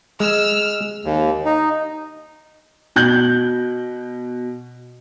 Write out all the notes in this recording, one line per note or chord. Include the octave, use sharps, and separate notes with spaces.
G#3 E6 F6
D#2
D#4
B2 G6 F#7